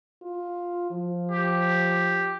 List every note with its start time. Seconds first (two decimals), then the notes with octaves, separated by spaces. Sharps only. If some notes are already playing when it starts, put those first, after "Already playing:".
0.22 F4
0.90 F3
1.31 G4